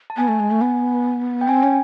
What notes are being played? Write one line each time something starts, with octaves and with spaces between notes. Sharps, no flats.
A5
B3 G#5
A3
G#3
A3
B3
G5
C4 G#5
C#4